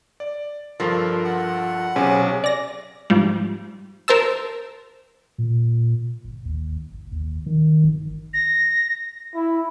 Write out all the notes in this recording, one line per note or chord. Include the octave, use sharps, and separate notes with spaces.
D5
G2 F3 A4 A#4
F#5
B1 C3 C#4 G#4
D5 A#6
G#2 F3 G3
A#4 C5 A5 E6
A#2
G1
D#2
G1
D#2
D#3
G1
A#6
E4